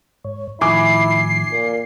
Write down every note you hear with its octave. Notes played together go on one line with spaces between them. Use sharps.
G#2 C#5
A2 D#3 F3 E4 G#5 D6 C7
A#2 A#4